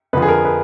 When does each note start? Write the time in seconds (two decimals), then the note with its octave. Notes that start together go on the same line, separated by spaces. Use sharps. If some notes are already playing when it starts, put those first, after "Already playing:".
0.13 F2 D3 F3 B4
0.22 G#4
0.28 A#4
0.45 B4